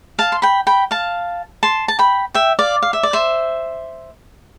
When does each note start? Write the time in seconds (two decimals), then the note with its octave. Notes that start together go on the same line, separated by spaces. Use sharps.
0.19 F5 A5
0.32 C6
0.42 G5 B5
0.67 G5 B5
0.91 F5 A5
1.63 A5 C6
1.88 A5
1.99 G5 B5
2.34 E5 G5
2.59 D5 F5
2.82 F5
2.93 E5
3.03 D5
3.13 C5 E5